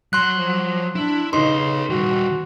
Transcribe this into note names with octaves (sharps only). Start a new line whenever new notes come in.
F#3 C6 F#6
F3
D4 E4
C#3 D#4 B4 C#5 C6
D#3 G3 F#4